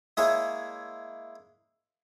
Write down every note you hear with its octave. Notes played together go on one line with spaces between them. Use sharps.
G#3 A#3 E4 G#4 C#5 E5